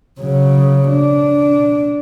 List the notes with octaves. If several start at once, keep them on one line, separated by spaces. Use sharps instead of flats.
C#3 F#3
D4